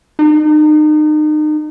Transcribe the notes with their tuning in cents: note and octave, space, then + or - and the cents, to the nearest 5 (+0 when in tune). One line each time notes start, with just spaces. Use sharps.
D#4 -35